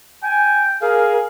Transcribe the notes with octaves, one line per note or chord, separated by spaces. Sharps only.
G5 G#5
G#4 A#4 F5